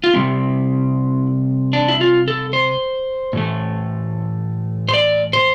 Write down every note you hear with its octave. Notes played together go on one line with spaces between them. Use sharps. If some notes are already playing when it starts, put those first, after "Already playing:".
F4
C3 G3 C4 E4
D4
E4
F4
A4
C5
A2 E3 A3
C5
D5
C5